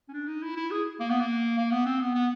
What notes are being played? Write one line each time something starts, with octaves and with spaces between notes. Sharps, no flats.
C#4
D4
D#4
E4
E4
G#4
A#3
B3
A#3
A#3
B3
C4
B3
B3